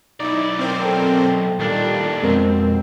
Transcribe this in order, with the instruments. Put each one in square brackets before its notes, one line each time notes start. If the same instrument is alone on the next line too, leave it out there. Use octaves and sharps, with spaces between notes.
[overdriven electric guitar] B1 D5 [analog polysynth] D#4 E4
[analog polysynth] C4 A#4 C5
[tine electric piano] A4 G5
[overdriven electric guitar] D#2 D4 [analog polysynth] A#2 D#3 G3
[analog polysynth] F2 B2 C4 [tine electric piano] G#3 A#4